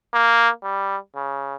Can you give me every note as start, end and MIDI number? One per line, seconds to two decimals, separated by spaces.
0.14 0.49 58
0.63 0.97 55
1.16 1.56 49